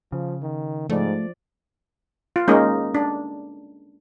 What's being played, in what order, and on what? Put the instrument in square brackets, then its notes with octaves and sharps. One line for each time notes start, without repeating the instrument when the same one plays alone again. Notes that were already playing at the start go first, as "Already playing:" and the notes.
[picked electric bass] C#3 [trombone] F3
[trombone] D#3
[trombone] G#2 [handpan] F3 D5 [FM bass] A3
[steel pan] F4
G#3 A#3 C#4 D#4
D4